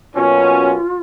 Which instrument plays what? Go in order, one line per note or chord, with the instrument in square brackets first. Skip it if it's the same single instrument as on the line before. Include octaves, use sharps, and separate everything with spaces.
[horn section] B2 F#3 A#3 C#4 [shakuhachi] F4